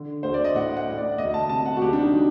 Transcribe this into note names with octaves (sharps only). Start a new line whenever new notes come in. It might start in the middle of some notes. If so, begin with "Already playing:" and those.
Already playing: D3
D2 C5
D5
D#5
A2 F#5
F#5
A2
D5
D2 D#5
A5
C3 A5
F#5
F#4
D2 G4
D4
D#4
F#3